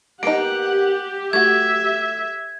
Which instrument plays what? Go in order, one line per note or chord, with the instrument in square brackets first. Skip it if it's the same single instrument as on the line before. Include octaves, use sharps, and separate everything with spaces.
[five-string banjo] A#3 B3 D#4 [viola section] G4 [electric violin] F#5 [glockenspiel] D7
[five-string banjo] A3 F#4 [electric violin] E5 [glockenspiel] G#6